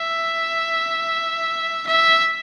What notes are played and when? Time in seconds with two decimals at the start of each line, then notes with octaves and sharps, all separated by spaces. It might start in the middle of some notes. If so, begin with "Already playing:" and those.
Already playing: E5
1.87 E5